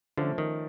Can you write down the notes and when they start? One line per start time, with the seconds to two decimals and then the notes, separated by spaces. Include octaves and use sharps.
0.17 D3 F3 A3 C#4
0.38 D#3